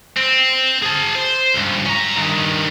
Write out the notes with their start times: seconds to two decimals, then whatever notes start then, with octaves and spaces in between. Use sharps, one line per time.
0.17 C4
0.83 G#4 A5
1.16 C5
1.54 C#2 G2
1.85 C#4 A#5
2.16 G2 D#3